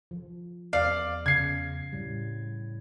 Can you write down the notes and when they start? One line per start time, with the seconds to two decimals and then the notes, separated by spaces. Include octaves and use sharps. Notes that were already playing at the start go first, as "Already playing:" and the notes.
0.11 F3
0.73 E2 D5 F5
1.26 C#3 G#6 C7
1.93 A2 G3